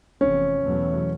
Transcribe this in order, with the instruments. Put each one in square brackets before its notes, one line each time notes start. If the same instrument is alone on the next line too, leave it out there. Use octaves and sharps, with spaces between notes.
[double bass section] F1 E2 C3 [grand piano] C#4
[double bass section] E2 B2 F#3 A3